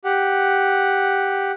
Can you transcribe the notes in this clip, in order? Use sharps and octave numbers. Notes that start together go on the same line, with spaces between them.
G4 F#5